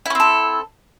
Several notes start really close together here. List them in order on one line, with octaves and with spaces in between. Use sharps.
E4 C#4 C4 A4